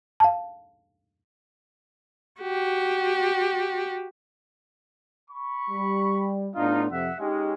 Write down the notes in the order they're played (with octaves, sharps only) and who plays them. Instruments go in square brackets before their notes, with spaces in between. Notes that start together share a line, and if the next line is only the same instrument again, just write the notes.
[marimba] F5 A5
[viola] F#4 G4
[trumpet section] B5 C#6
[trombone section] G3
[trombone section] A2 B3 D4 [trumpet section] D#4 F4
[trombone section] F2 C3 F3 [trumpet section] E5 F#5
[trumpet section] G#3 C#4 [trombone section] D#4 G4